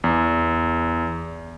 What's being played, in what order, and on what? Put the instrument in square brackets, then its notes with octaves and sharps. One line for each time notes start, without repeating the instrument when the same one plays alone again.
[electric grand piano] E2